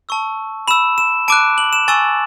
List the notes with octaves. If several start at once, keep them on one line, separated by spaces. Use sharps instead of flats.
A5 C#6 E6
B5 E6 E7
E7
A5 D6 F#6 D7
F#7
E7
G#5 C#6 E6 A6